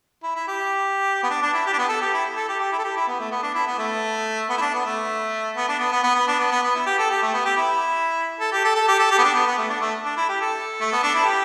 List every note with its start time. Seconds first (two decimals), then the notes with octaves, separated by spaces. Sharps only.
0.23 E4
0.36 E4
0.48 G4
1.23 B3
1.30 D4
1.42 D4
1.54 E4
1.67 G4
1.73 D4
1.78 B3
1.89 A4
2.02 G4
2.14 E4
2.36 A4
2.49 G4
2.60 G4
2.73 E4
2.79 A4
2.84 G4
2.97 E4
3.08 B3
3.20 A3
3.32 B3
3.43 D4
3.55 E4
3.67 B3
3.79 A3
4.50 B3
4.58 E4
4.62 D4
4.74 B3
4.86 A3
5.57 B3
5.69 D4
5.79 B3
5.92 B3
6.04 B3
6.16 B3
6.28 D4
6.40 B3
6.52 B3
6.63 B3
6.75 E4
6.86 G4
6.99 A4
7.11 G4
7.23 A3
7.34 B3
7.45 G4
7.57 E4
8.40 A4
8.53 G4
8.65 A4
8.75 A4
8.88 G4
8.99 A4
9.11 G4
9.19 B3
9.24 D4
9.34 B3
9.47 B3
9.58 A3
9.70 D4
9.82 A3
10.05 D4
10.17 E4
10.29 G4
10.42 A4
10.81 A3
10.92 B3
11.03 D4
11.14 E4
11.24 G4